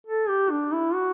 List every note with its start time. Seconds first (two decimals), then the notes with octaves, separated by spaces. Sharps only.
0.07 A4
0.29 G4
0.51 D4
0.73 E4
0.94 F#4